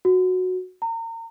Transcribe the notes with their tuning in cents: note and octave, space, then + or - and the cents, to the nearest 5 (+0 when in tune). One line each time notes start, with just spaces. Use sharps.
F#4 -10
A#5 -35